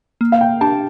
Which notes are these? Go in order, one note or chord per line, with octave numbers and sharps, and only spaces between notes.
A#3
F5
G5
D4 G4 A5